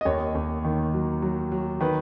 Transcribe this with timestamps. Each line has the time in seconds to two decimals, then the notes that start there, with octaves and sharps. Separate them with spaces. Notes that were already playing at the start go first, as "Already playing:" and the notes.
0.01 D#5
0.05 D#2 C#5
0.35 D#2
0.65 D#3
0.94 F#3
1.22 F#3
1.52 F#3
1.80 D#3 B4